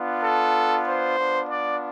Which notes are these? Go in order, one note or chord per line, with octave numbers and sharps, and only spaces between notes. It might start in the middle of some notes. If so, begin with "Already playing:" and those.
Already playing: B3 D4 F4
A4
C5
B3 D4 F4
D5